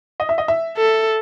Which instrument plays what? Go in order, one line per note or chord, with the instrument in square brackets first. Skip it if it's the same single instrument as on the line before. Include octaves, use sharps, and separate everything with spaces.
[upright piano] D#5
E5
D#5
E5
[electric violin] A4